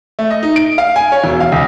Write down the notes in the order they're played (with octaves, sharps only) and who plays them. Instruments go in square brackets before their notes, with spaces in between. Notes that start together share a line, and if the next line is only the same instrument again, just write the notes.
[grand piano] A3
D#5
D#4
D7
F5
G#5
C#5
E1
F5
C#2